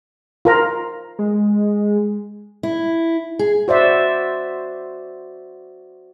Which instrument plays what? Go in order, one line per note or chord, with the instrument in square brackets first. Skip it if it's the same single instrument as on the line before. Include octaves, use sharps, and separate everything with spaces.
[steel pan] F4 A#4 A#5
[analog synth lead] G#3
[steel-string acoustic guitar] E4
G#4
[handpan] F#4 C5 D5 E5